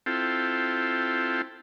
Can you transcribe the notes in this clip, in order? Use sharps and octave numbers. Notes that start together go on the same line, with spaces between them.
C4 E4 F4 A4 G5